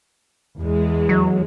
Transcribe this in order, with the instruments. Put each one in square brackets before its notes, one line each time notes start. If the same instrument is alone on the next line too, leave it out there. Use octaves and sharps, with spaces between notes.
[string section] E2 E3 G#3
[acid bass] F#3